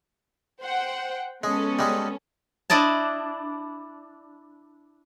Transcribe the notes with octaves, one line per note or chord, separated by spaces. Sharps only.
C5 F#5 G5
G#3 B3 C#4 A4
G3 G#3
D4 E4 D5 D#5 A5